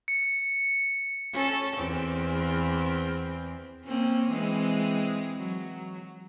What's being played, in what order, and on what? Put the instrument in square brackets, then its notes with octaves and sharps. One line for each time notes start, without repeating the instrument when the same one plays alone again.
[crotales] C#7
[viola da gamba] C#4 A4
E2 C4
A#3 C4 C#4
E3 G#3 C4
F#3